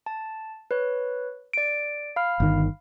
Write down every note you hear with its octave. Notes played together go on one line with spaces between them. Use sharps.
A5
B4 C#5
D5 D7
F5 B5 F6
G1 D#3